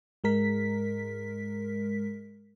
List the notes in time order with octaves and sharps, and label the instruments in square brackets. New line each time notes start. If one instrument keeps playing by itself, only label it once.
[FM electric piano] G#2 G#3 A#4 B6